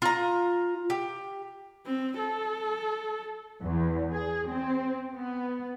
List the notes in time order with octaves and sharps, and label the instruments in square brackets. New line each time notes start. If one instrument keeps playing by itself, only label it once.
[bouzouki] F4 A#5
G4
[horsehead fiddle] C4
A4
[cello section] E2
G#4
C4
B3